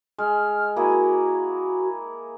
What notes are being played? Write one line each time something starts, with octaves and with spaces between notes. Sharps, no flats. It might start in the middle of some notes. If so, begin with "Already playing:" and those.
G#3 F6
A#3 E4 F#4 G#4